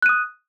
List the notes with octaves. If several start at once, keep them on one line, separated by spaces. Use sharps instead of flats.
D#6 F#6 D#7